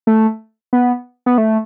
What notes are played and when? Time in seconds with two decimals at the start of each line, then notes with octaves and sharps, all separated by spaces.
0.07 A3
0.73 B3
1.26 B3
1.38 A3